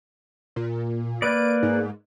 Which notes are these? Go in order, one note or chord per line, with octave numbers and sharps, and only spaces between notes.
A#2
A#3 B4 D5 D7
G#2